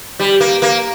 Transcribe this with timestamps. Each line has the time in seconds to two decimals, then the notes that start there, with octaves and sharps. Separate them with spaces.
0.19 G3
0.40 A#3
0.62 A#3